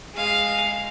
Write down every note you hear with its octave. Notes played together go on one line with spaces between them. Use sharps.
G#3 F5